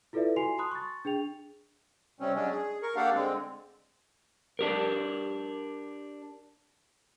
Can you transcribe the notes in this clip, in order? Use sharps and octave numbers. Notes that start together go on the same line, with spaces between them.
E4 F4 A4 B4 D5 E5
F#4 G#5 C6 C7 F7
A5 B5 C6 D#6 F#6
C#6 A6
D4 G#4 G5 F7
C3 G3 C4 C#4
F#3 G#3 C#4 D4
G#4
A#4 C#6
A#3 D4 G4 A4 F5 F#5
D3 G#3 C4
D4 G4 A#4